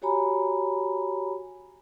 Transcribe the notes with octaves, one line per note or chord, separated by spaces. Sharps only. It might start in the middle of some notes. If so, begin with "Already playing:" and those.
F#4 G4 C#5 G#5 A#5 B5